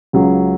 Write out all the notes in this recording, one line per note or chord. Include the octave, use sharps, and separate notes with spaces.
C#2 C#3 F#3 C#4 G#4